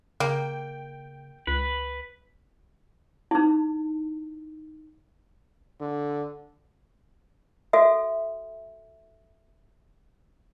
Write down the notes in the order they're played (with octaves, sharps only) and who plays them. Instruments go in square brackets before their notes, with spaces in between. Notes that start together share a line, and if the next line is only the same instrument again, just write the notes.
[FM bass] C#3 [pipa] A#3 [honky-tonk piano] G5
[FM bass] C#2 [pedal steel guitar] B4
[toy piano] D#4 E4
[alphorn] D3
[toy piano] F#4 A4 E5